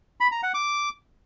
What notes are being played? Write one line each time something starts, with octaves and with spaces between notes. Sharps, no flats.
B5
A#5
F#5
D6